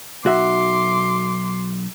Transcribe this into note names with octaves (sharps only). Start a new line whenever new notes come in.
B1 F#4 E5 C6 D6